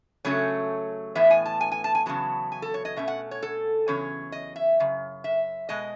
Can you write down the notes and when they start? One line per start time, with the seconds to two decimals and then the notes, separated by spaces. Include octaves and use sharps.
0.25 C#3 F#3 A3 C#4 C#5
1.15 A2 E3 B3 E5
1.30 G#5
1.46 A5
1.61 G#5
1.72 G#5
1.84 A5
1.95 G#5
2.06 E2 C#3 F#3 B3 A5
2.52 G#5
2.62 A4
2.74 C#5
2.85 D#5
2.96 B2 A3 C#4 E5
3.08 F#5
3.31 C#5
3.42 A4
3.88 E2 C#3 F#3 C#4 C#5
4.32 D#5
4.56 E5
4.80 F#2 C#3
5.24 E5
5.69 B2 G#3 D#5